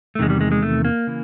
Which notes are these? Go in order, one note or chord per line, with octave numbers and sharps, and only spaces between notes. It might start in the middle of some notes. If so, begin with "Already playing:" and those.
A3
E2 C3 D#3 G#3
G3
G#3
G#3
A3
A#3
C#3 E3